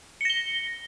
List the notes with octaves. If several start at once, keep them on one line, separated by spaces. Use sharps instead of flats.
A#6 C#7 G7